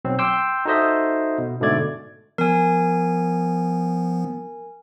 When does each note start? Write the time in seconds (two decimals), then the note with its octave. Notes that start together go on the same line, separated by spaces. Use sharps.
0.05 B1 B2 F#3 C4
0.19 G5 C6 D6 E6 G6
0.65 D#4 F#4 A4 C5 D#5 E5
1.38 B2
1.61 G#2 B2 D3 A3 D5 G#6
2.38 F3 B3 A#4 G#5